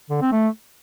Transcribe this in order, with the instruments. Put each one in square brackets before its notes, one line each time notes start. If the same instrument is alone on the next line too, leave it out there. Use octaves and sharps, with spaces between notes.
[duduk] D3
C4
A3